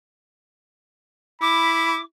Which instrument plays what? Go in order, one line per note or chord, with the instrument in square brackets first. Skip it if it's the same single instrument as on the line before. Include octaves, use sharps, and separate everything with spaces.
[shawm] E4 [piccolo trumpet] B5 [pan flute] D6